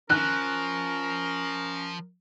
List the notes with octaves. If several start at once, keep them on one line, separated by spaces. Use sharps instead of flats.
F3 C#4 A#4 F#6